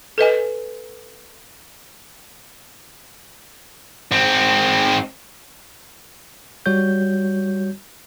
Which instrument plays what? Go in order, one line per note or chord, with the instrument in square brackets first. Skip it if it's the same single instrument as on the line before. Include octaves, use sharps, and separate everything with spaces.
[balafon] A4 B4 D#5 G#5
[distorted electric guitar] G#2 C4
[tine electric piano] G3 F#4 C#5 G6